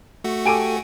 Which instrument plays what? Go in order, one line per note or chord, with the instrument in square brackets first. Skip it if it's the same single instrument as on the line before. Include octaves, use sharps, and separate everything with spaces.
[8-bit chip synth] A3 F#4
[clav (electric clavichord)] G4 A4 [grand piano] G#5 D7 D#7